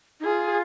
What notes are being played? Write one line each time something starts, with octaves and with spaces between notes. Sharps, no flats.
D#4
F4 G#4